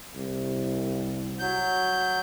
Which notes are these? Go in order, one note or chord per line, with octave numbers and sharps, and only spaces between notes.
C2
F#3 G6